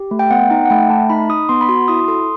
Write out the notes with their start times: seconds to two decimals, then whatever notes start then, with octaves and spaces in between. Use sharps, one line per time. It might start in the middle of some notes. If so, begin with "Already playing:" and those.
Already playing: G4
0.11 A3
0.19 G5
0.31 B3 F#5
0.51 D#4 G5
0.65 F#5
0.70 A3 G5
0.90 A3 A5
1.09 D#4 B5
1.29 D#4 D#6
1.49 B3 C6
1.61 B5
1.69 F#4 C6
1.88 E4 D#6
2.00 D#6
2.08 A4 C6